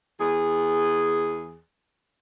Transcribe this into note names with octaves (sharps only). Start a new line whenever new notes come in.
E2 G#4